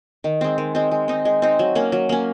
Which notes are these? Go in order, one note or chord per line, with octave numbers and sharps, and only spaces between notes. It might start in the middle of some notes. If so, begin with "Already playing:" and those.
D#3
G#3 C4
D#3
G#3 C4
G#3
C4 D#4
G#3
C4 D#4
F#3
A#3 C#4
F#3
A#3 C#4